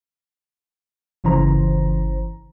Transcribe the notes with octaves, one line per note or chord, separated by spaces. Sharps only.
G1 C#3 E3 C5 A#5